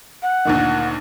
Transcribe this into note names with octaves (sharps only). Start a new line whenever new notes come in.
F#5
D2 A#2 D#3